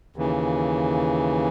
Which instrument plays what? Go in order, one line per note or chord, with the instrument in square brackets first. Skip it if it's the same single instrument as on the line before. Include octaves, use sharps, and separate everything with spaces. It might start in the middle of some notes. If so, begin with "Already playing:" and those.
[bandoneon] D#2 C#3 E3